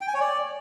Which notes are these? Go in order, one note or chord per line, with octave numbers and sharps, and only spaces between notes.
G5
G#5
C#5
D5